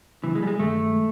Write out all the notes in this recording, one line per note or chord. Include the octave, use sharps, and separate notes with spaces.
C#3 E3 F#3 B3 D4
G#3
G3
G#3
G2 D#3 G#3 A3
G#3